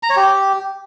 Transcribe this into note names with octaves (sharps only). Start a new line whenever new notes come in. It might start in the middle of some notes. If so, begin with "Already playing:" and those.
A#5
C#5
G4